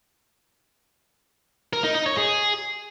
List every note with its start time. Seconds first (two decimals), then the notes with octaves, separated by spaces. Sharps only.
1.73 A#4
1.84 D#4
1.95 D#4
2.06 C#5
2.17 G#4